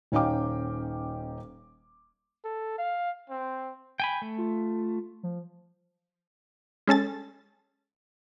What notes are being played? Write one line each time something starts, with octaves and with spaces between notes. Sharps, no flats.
D#1 C#4 D#4 F5 G5 D6
A4
F5
C4
G5 G#5 B5
A3
F4
F3
G#3 C#4 A4 A6